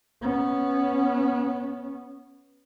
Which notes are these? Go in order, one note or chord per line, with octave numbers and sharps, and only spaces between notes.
B3 C#4